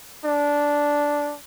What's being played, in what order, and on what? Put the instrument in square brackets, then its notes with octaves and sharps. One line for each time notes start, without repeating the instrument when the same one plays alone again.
[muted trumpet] D4